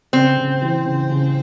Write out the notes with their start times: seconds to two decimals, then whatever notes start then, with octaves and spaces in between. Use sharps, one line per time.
0.13 C#3 C4
0.37 C#3
0.62 E3
0.85 C#3
1.10 C#3